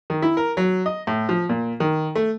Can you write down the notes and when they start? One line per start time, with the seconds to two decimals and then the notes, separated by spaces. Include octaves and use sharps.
0.10 D#3
0.22 E4
0.37 A#4
0.57 F#3
0.86 D#5
1.07 A2
1.29 F3
1.49 A#2
1.80 D#3
2.15 A3